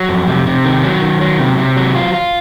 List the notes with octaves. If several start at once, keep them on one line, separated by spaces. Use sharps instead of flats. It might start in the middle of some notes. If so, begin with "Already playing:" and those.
Already playing: F#3
F2
C3
C3
D#3
F#3
D#3
F#3
C3
C3
F#3
F4
F4